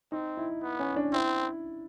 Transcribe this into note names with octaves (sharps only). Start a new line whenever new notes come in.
C4 D#4
E4
B3
C#4
D4
C4 E4